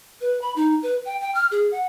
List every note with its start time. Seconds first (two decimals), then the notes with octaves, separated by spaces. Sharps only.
0.21 B4
0.42 B5
0.56 D#4
0.83 B4
1.05 G5
1.20 G5
1.35 F6
1.51 G#4
1.72 F#5